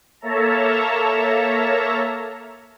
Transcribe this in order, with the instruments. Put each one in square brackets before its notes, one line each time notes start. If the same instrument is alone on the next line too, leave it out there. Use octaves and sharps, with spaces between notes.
[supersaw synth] A#3 A4 C#5 E5 A5 A#5